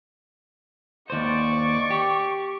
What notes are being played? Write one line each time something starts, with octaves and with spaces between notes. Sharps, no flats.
D#2 C5 D5 C#6
G4